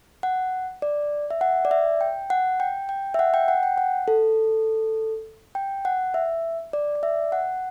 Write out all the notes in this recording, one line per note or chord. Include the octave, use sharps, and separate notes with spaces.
F#5
D5
E5
F#5
D5
E5
G5
F#5
G5
G5
E5
F#5
G5
F#5
G5
F#5
A4
G5
F#5
E5
D5
D5
E5
F#5